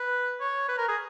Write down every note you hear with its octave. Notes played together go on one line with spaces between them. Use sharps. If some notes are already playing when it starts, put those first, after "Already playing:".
Already playing: B4
C#5
B4
A#4
G#4